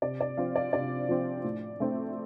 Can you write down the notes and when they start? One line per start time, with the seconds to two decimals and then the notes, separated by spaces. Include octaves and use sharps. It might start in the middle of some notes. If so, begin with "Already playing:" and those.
0.02 C3 D5
0.21 D5
0.37 F3 C4 F5
0.56 D5
0.73 C3 D5
1.09 F3 C4
1.44 A2
1.80 A3 C4